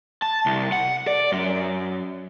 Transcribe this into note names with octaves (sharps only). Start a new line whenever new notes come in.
A5
C2
F#5
D5
F#2